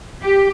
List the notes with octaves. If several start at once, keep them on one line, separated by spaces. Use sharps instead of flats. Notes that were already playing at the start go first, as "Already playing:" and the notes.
G4